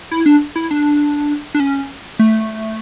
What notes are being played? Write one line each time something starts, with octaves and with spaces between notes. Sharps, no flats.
E4
D4
E4
D4
D4
C#4
A3